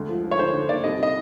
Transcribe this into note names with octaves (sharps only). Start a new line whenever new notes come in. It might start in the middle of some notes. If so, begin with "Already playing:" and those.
Already playing: D2 G#3
F3
F3
C#5
D3 C5
D3
A#3 D5
C2 D#5
D#5